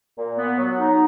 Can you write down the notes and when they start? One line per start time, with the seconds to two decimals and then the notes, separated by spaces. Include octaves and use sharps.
0.18 A#2
0.38 B3
0.58 F#3
0.78 D#4